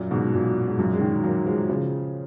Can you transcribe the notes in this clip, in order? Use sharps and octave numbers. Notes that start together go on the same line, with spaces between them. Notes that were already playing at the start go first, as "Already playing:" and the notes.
Already playing: F#2 A#2
G#2 B2
F#2 A#2
G#2
F#2 A#2
G#3
D#3 F#3
F#3 A#3
F3 G#3
C#3 F3